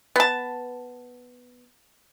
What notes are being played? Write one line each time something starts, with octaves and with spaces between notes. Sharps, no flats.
B3 A5